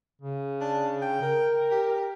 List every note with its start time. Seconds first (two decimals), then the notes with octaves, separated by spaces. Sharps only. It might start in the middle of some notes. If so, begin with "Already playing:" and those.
0.21 C#3
0.61 D4
1.02 G5
1.22 A#4
1.71 G4